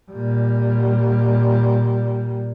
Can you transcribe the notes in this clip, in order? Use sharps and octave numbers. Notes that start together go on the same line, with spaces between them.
A#2 G3